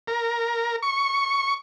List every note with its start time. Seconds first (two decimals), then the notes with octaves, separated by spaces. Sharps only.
0.08 A#4
0.82 C#6